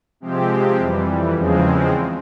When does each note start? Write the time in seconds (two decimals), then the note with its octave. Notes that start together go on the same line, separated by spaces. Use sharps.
0.20 C3 F3 G#3 C4 G4
0.78 F2 E3 G3
1.34 E2 C#3 F3 G#3 C4